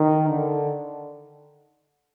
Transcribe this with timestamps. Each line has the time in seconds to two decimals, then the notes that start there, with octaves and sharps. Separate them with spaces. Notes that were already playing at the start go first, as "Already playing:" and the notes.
Already playing: D#3
0.28 D3